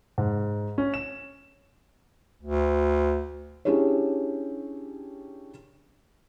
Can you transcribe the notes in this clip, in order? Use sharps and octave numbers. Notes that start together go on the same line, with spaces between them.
G#2
C#4
E7
D2
C#4 D4 E4 G4 G#4 C#5